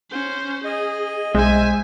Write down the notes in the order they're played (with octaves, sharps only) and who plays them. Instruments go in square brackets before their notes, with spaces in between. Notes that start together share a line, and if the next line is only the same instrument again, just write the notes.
[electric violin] C#4 C5
[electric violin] G#4 [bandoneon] D#5
[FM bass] B1 [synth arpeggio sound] G#3 [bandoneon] C5 [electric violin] E5 G#5